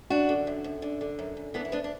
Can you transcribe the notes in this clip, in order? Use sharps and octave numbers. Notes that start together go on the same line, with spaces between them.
F#2 D4 F#4
D3
F#2
F#2
D3
D3
F#2
F#2
E3 B3 D4
E4
D2 B3 D4
D4